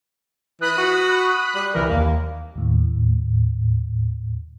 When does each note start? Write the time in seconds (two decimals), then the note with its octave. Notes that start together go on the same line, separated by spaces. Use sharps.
0.61 E3 B5 D#6 F#6
0.78 F#4
1.55 G3
1.74 C2 E3 A#4
1.89 D#2 A#3
2.56 D#2 A2